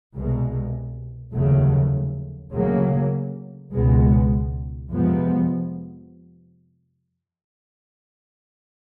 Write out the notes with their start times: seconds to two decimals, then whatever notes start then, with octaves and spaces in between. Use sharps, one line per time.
0.14 C2 B2 G#3
1.33 F1 D#2 C#3 F#3 A3
2.52 D2 C#3 F#3 A#3
3.72 C#2 B2 G#3 B3
4.91 F2 C3 F3 G#3 B3